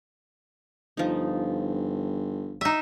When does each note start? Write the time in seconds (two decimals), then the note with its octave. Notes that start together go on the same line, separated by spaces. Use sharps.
0.97 G1 F3 D#4
2.61 D#4 E5